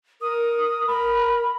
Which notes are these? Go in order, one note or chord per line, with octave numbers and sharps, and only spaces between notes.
A#4 D#6
A#4 B5